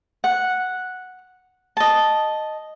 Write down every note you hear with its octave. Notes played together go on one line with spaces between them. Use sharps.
F#5
D#5 A5